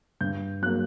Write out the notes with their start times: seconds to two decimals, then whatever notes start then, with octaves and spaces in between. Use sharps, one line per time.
0.21 G2 G6
0.62 F#3 A#3 F#6